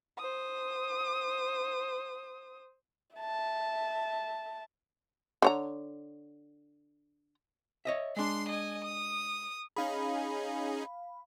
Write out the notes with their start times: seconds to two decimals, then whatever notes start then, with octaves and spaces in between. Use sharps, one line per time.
0.18 C5 D#6
3.17 E5 A5
5.42 D3 C#5 A#5
7.85 C#5 D#5 E5
8.17 G#3 D4 C6 C7
8.48 D#5 G#5
8.84 D#6
9.77 C#4 D#4 G#4 F5 B5